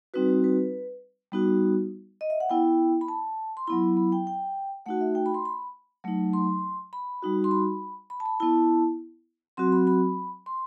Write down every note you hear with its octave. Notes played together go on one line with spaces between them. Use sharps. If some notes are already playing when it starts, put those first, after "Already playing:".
G3 C4 D#4 F#4 B4
B4
G3 B3 D#4 F#4
D#5
E5
F#5
B3 E4 G5
B5
A5
C6
F#3 B3 E4 B5
B5
G5
G5
A3 D#4 F#4 F#5
E5
G5
B5
C6
B5
F#3 A3 D#4
C6
B5
G3 D#4 F#4
C6
B5
B5
A5
B5
B3 E4 A5
F#3 C4 F#4 C6
B5
B5
C6